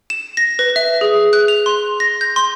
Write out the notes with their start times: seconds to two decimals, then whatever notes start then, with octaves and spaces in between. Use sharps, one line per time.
0.10 E7
0.37 A#6
0.59 B4
0.76 E5
1.01 G#4
1.33 F#6
1.48 F7
1.66 C6
2.00 A#6
2.21 G6
2.36 C6